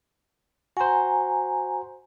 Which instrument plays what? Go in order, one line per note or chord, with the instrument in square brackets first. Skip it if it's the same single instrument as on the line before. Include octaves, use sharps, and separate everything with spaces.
[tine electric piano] F#4 C5 [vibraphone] G#5 A#5